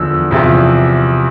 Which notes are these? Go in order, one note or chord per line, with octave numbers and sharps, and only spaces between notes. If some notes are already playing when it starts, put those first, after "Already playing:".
Already playing: E2 D3 F3 E6
E2 C3 F3